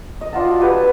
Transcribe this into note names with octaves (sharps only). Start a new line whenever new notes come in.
D#5
D4 F4 F#5 A5
F#4
G4 B4 C#5
A5